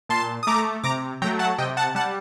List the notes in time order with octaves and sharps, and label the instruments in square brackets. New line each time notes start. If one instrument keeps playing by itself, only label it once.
[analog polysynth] A#2 A5 C6
D#6
A3 A#5 D6
C3 A#5 D6
F#3 A3 G5 A#5
F#5 A5
C3 D#5 G5
F#5 A5
G3 F#5 A5